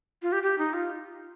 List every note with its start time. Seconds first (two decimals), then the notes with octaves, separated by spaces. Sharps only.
0.22 F4
0.32 G4
0.43 G4
0.58 D#4
0.73 F4